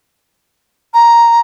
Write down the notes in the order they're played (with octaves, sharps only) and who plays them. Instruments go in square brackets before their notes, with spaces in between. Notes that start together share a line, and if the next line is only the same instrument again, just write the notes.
[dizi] A#5